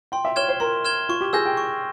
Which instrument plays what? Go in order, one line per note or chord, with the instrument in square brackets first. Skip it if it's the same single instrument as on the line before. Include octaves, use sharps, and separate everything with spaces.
[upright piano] G5 [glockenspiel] C6
[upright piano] E5
[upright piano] C#5 [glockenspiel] F6 G#6 E7 G7
[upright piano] C5
[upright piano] A#4 [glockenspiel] C6
[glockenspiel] F6 G#6 E7 G7
[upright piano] F4 [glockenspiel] C#6
[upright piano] G4
[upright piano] G#4 [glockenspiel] E6 G6 A#6
[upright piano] G5
[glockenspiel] C#6